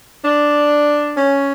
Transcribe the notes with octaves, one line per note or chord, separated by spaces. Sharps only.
D4
C#4